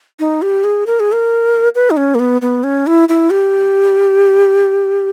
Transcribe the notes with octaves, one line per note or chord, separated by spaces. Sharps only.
D#4
G4
G#4
A#4
G#4
A#4
B4
D#4
C#4
A#3
B3
B3
C#4
E4
E4
G4